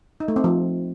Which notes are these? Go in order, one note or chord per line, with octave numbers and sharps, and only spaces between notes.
D#4
A3
C4
F3